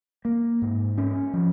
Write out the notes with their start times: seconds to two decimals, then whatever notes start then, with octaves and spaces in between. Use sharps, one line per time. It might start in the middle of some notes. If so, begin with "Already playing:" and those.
0.25 A#3
0.62 G#2
0.98 C#4
1.33 F3